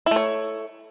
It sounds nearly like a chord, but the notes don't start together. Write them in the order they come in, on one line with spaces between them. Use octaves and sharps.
E4 A3 C#5